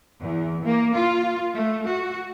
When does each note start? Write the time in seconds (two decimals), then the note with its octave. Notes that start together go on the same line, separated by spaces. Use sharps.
0.22 E2
0.65 A#3
0.95 F4
1.54 A3
1.86 F#4